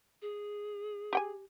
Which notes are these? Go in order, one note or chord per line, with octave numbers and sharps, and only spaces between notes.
G#4
G4 G5 G#5